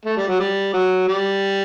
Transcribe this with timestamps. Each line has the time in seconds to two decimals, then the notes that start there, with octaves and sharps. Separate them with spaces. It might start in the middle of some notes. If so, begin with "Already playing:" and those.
0.05 A3
0.17 G3
0.28 F#3
0.40 G3
0.73 F#3
1.08 G3